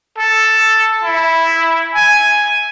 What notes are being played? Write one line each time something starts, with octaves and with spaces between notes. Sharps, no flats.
A4
E4
G#5